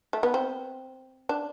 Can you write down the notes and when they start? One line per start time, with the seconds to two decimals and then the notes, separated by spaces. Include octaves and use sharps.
0.13 A3
0.23 B3
0.34 C4
1.29 D4